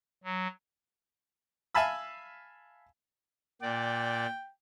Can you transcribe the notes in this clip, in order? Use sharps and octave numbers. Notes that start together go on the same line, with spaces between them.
F#3
E5 F5 G#5 A5 B5 E6
A#2 D5 G5